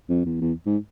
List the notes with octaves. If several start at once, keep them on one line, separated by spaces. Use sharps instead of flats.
F2
E2
E2
G#2